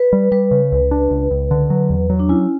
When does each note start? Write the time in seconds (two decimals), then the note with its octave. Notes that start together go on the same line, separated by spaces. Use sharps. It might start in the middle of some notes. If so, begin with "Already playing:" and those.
Already playing: B4
0.13 G3
0.32 G3 B4
0.51 C#3
0.72 C#2
0.91 D4
1.10 C#2
1.31 C#2
1.51 D3
1.70 F#3
1.90 E2
2.10 F#3
2.19 D4
2.29 C#4 E4